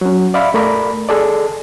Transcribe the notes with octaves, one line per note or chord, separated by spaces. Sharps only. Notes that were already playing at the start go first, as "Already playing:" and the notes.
F#3 C#4
D5 E5 F5 B5
A3 A#4 D5 B5
G#4 A4 D5